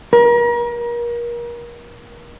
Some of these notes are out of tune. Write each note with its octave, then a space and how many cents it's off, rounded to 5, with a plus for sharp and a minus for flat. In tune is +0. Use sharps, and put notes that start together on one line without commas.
A#4 +35